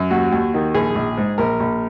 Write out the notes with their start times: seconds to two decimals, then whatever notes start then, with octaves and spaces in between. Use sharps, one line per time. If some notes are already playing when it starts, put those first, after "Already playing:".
Already playing: F#2
0.10 D#2 F#4
0.32 D#2
0.54 D#3
0.74 A#1 G#4
0.95 A#1
1.17 G#2
1.38 A#1 A#4
1.60 A#1